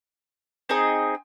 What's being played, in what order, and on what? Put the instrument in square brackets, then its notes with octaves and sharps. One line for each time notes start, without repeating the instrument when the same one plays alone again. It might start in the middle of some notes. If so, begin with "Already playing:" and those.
[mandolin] C4 D#4 G#4 D#5